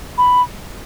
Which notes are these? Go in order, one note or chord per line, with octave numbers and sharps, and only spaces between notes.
B5